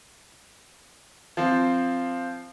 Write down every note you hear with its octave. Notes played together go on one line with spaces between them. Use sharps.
F3 C4